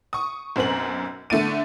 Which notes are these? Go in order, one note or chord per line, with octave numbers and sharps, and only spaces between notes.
C#6 D#6
B1 F#2 C4 A#4 F#7
D3 A3 D4 A6 D#7